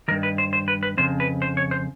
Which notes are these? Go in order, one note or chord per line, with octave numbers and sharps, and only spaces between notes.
G2 D#3 A#4
B4
C5
C5
B4
B4
F2 C#3 C5
B4
C5
C#5
C5